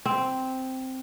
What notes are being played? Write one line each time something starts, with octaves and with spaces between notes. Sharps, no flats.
C4